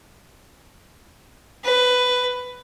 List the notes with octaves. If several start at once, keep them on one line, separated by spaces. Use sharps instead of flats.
B4